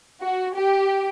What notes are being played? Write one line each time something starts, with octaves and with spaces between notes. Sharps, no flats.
F#4
G4